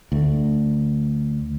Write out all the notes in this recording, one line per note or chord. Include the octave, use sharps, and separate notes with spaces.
D2